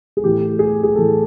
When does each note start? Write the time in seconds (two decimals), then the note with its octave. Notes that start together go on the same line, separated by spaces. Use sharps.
0.17 G#4
0.24 A2 E3 G4
0.59 G#4
0.83 G#4
0.95 A2 E3 A4